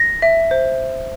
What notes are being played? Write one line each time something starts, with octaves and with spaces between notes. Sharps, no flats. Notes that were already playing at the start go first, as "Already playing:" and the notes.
Already playing: A#6
E5
C5